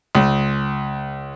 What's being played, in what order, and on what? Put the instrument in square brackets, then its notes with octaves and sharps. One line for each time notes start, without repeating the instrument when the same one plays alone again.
[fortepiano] C#2